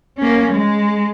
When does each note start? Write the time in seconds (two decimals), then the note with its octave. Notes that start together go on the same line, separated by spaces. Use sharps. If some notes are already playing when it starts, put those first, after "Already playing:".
0.18 A#3 C#4
0.52 G#3